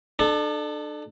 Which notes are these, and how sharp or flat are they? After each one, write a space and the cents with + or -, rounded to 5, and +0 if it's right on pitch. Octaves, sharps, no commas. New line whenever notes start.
D4 +35 A4 -15